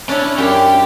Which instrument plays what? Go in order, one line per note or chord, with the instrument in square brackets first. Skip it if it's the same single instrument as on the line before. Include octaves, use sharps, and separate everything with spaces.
[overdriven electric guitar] C#4 [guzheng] D4 E4
[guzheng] F#2 [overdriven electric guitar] G4 G5